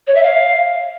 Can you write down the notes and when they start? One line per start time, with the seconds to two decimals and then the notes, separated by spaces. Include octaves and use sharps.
0.07 C#5
0.15 E5
0.23 F5